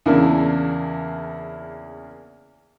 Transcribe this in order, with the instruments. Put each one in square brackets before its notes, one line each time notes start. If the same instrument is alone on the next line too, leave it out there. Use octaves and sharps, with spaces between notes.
[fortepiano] E2 C#3 A#3 D4 E4